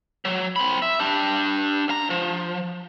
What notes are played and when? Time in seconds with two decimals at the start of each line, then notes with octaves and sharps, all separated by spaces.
0.25 F#3
0.56 C4 B5
0.82 E5
1.00 D4 G4
1.88 C2 A#5
2.10 F3